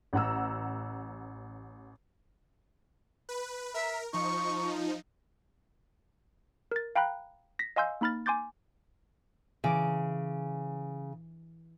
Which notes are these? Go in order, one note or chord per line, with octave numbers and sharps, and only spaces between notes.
A1 F#5 A#5 E6
B4
A#4 E5
F3 D#4 C#6
A#4 A6
F5 G5 A#5 B5 F#6
A#6 B6
D#5 F5 G#5 C6 E6 G6
A#3 D#4 B5 F6 A6
G#5 C6 D6 G6 A6
C#3 E3 D6